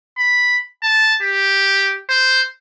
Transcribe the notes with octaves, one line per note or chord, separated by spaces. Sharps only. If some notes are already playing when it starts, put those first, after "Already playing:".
B5
A5
G4
C5